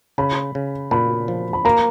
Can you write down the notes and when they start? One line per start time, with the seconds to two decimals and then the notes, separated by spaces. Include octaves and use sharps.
0.18 C#3 B5
0.55 C#3
0.91 A#2 B5
1.28 F3
1.53 B5
1.65 A#3 A#5